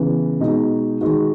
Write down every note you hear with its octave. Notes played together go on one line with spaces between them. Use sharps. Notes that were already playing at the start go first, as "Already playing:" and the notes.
Already playing: C#3 E3 B3
B2 G#3 D#4 F#4
D#3 G#3 D#4 F#4